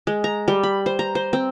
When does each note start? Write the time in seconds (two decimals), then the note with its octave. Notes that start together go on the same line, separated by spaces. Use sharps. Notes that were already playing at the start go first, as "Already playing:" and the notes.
0.07 G#3
0.24 A#5
0.48 G3
0.63 B5
0.86 C5
0.99 A#5
1.15 C5
1.33 C4